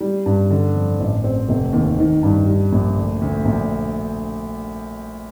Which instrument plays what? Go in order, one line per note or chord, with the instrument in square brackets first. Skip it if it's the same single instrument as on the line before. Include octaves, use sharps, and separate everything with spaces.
[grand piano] G3
G2
D3
F2
A1
C4
F1
D#2
D#3
G2
G3
A#1
D2
D2
A#1